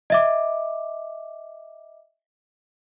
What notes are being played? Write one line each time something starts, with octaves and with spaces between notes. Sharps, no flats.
D#5 E5 D6